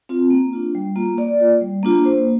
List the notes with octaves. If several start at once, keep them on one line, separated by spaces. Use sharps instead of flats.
C4 F4
A#3
D4 F4
G3
A#3 F4
A#3 D5
F4
G3
A#3 D4 F4
A#3 C5